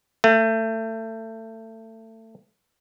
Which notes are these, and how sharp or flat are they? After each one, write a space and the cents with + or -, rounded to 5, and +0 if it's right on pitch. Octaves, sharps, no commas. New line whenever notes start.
A3 +25